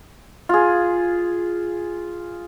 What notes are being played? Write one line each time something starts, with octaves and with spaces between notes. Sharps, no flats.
F4 G#4